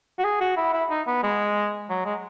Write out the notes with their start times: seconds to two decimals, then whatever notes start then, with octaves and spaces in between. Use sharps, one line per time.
0.19 F#4
0.25 G#4
0.41 F#4
0.57 E4
0.73 E4
0.90 D#4
1.07 B3
1.23 G#3
1.90 F#3
2.05 G#3